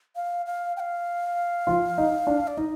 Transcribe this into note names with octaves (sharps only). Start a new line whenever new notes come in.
F5
F5
G5
F5
F3 F4
D#4
D4
D5
D#4 D#5